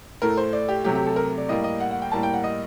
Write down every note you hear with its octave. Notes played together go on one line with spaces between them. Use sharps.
A2 A3 A#4
C5
D5
G4
C3 F#3 A3 G4
G4
A4
A#4
D5
A2 G3 A#3 D#5
D#5
F#5
F#5
G5
A2 G3 A#3 A5
G5
F#5
D#5